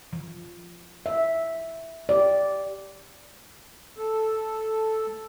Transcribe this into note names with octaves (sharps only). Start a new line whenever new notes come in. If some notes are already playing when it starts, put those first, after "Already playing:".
F3
E5
G4 D5
A4